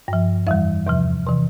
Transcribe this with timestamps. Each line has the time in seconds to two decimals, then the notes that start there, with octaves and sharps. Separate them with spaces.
0.08 G2 F3
0.47 F2 E3 G3 E5
0.87 E2 C3 F3
1.27 C3 E3